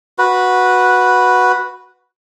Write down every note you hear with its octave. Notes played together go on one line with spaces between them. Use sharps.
F#4 B4